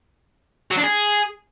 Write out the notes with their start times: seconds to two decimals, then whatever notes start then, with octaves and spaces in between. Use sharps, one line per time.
0.71 F#3
0.77 D4
0.83 G#4